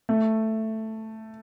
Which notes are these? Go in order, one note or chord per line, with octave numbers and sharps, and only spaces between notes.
A3